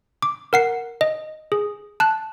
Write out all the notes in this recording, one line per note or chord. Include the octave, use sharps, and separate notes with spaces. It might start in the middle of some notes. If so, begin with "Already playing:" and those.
D6
A#4 F#5 C7
D#5
G#4
A5 F#6